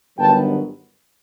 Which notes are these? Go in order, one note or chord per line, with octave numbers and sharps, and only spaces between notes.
G1 G2 D#3 F#3 B3 G5 A5